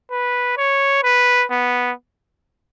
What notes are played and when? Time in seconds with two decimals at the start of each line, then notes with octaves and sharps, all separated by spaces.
0.11 B4
0.57 C#5
1.04 B4
1.50 B3